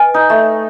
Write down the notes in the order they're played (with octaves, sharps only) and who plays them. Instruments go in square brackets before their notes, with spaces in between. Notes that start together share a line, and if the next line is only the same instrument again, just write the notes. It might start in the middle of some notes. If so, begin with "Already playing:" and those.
Already playing: [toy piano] B4 D#5 G#5
[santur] D#4
A3